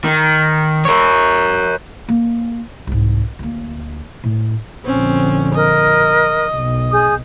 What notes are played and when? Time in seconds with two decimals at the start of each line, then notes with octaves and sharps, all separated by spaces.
0.04 D#3
0.85 A#4 C#5
2.08 A#3
2.87 C2 G#2
3.39 D2 A#3
4.24 A2
4.85 A#1 D3 C4 C#4
5.55 A#4 D#5
6.54 B1
6.91 G#4 D#6 G6